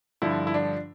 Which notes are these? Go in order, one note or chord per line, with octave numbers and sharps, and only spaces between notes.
G2 D3 F3 E4
E4
D4